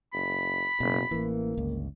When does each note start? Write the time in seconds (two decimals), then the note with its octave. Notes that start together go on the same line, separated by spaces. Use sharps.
0.13 F#1 B5
0.80 F#1 B2
1.11 A1 E3 A#3
1.57 G1 C#2